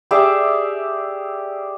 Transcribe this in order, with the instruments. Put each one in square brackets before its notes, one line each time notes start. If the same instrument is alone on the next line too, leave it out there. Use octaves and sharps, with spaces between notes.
[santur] G4 G#4 D5 E5